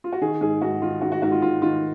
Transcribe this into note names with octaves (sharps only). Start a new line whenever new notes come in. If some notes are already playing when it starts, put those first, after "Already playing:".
F4
F#4
D#3 G#4
G#2 G#4
G#2 F#4
D#3 F4
D#3 F#4
F#4
G#2 F#4
F4
G#2 F4
D#3 F4